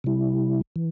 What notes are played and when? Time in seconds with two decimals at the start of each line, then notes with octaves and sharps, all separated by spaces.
0.04 C3 G3 E4
0.76 E3